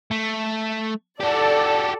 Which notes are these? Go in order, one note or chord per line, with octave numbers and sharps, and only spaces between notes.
A3
F#4 G4 A4 D5